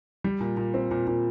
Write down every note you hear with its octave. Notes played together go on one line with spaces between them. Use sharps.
G3
A#2
A#2
C4
A#2
A#2